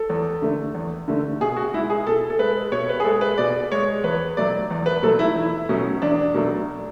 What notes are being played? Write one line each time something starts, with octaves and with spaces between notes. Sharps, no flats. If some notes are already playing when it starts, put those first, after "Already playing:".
Already playing: A4
E2
D3 A3
E2
D3 A3
B2 G#4
F#4
G#3 E4
G#4
B2 A4
A4
G#3 B4
B2 C#5
B4
G#4
G#3 A4
B4
B2 D5
G#3 C#5
E2 B4
B2 F#3 A3 D5
E2
B4
B2 F#3 A3 A4
E4
E2 E4
B2 F#3 A3 C#4
E2 D4
B2 F#3 A3